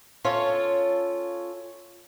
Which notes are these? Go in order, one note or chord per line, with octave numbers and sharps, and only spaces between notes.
C#4 F4 A4 C#5